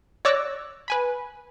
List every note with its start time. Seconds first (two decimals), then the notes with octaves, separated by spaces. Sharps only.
0.25 C#5 D5 D6 E6 F#6 A#6
0.88 B4 G#5 B5